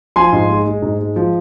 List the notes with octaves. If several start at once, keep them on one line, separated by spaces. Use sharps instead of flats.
F3 G#5 C6
G#2
G#3
G#3
G#2
G#3
F3